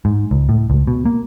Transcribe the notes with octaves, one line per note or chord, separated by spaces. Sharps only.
G#2
C#2
A2
C#2
B2
A#3